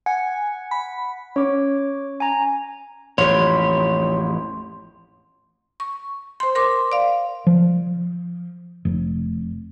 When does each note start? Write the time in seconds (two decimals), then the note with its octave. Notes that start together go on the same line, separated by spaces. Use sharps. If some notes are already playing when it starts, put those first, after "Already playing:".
0.06 F#5 G#5
0.71 B5
1.36 C#4 C#5 D6
2.20 G#5 A#5
3.18 A1 F2 G4 C#5 C6
5.80 C#6
6.40 C5 C6
6.55 A#4 C6 D6
6.92 D5 F5
7.47 F3
8.85 F1